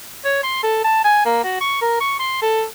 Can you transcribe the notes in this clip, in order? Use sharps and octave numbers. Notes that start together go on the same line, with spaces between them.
C#5
C6
A4
A5
G#5
A#3
F#4
C#6
A#4
C#6
C6
A4